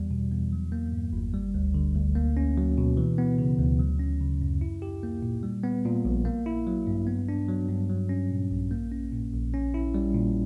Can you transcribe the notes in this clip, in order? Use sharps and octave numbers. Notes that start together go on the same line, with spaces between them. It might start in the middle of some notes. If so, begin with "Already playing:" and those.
Already playing: E2 G3
B2
E2
F#3
A#3
G2
G1
G3
D2
D3
D2
A#3
C#4
F#3
B2
E3
B3
C#3
D2
F#3
C#4
C#3
F#2
E4
G4
A#3
A#2
G3
B3
A#2
A#1
A#3
E4
F#3
G2
B3
D4
F#3
G2
F#3
C#4
A#2
A#1
A#3
C#4
A#2
A#1
C#4
E4
G3
A#2